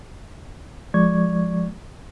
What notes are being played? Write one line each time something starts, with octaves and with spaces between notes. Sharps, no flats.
F3 G#3 D5 C#6 G#6